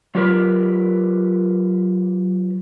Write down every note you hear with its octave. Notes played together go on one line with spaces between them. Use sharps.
F#3 F4 G4 A#4 B4